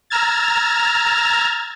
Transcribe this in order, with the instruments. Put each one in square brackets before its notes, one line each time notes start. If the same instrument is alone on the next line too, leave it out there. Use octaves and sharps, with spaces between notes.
[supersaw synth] A#5 E6 F6 G#6 A6